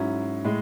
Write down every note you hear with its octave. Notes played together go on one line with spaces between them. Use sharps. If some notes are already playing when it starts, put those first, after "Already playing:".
Already playing: G#2 F#3 C#4 E4
A2 G#3